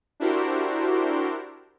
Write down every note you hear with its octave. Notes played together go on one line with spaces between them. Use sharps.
D4 E4 F#4 G4 A#4 C5